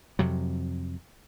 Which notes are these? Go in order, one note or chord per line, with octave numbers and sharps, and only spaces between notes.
F2 C3 F#3